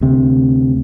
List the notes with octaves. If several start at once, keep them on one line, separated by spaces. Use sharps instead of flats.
D2 C3